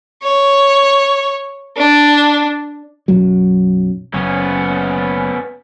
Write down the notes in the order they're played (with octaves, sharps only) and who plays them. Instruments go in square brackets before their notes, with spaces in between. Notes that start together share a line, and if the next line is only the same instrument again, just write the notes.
[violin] C#5
D4
[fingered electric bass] B1 F#2 F#3
[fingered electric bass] F#1 [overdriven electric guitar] B3 C#4